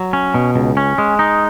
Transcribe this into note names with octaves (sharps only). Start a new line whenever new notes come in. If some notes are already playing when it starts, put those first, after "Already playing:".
Already playing: F#3
C#4
B2
C#2
C#4
G#3
D#4